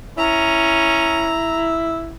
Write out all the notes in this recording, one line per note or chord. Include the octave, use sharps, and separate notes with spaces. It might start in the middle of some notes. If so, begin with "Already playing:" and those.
C#4 E4 A#5